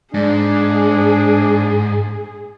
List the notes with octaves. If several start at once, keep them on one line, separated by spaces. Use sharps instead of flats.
G#2 D4 G#4